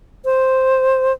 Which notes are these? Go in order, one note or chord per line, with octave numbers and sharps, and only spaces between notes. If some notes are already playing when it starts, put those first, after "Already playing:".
C5